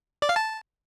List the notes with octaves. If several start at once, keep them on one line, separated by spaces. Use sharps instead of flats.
D5
F5
A5